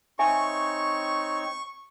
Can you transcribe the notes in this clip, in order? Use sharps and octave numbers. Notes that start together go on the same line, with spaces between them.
C4 D#4 C#5 E5 G#5 C#6